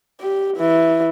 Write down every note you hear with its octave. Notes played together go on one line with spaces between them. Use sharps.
G4
E3